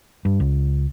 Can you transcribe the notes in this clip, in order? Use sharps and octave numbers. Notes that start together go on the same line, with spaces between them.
G2
C#2